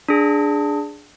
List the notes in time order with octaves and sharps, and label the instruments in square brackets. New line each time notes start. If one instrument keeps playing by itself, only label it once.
[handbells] D4 G#4